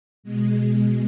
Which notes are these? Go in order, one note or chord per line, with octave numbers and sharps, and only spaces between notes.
B2 G#3